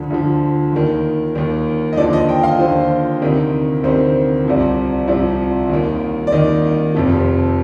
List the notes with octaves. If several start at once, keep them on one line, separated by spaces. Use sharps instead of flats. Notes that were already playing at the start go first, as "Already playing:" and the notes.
Already playing: D2 D3 F3
D2 D3 F3
D#2 D#3
D#2 D#3
D#5
D#2 D3 F3 D5
D#5
G5
F5
D#2 D3 F3 C5
D2 C3 D#3
D2 C3 D#3 C5
C2 C3 F3
C2 C3 F3
D#2 D#3
D5
D#2 D#3 D#5
F1 F2 C3 F3